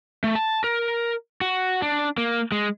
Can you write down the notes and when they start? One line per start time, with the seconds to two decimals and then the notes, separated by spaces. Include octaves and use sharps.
0.24 A3
0.35 A5
0.64 A#4
1.41 F#4
1.82 D4
2.18 A#3
2.52 G#3